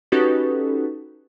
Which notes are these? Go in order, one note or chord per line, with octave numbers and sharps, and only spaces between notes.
C#4 D#4 F#4 G4 A4 B4